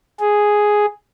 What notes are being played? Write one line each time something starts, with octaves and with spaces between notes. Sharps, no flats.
G#4